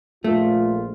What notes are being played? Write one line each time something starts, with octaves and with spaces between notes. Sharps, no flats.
A#1 A3 F4